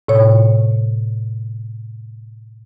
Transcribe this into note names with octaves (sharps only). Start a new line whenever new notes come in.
A2 C3 C#5